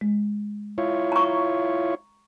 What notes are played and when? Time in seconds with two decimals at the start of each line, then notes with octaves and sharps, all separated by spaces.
0.01 G#3
0.78 E4 F4 C#5
1.12 A#5 C#6